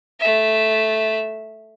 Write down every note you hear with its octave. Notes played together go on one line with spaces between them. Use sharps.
A3 E5